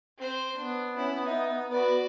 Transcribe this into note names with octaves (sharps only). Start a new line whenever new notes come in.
C4 C5
B3 D4
C#4 E4
D#4 E5
F#4 B4 D5